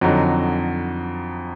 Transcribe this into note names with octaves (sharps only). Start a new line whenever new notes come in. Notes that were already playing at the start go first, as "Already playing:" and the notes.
F2 D3 F#3 D#4 F#4